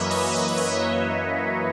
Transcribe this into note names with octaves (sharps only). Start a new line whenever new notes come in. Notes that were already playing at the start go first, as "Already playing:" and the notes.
Already playing: F#2 E3 A#3 B4 C#5 D#5 E5
B4 D#5
C#5 E5
D#5
C#5 E5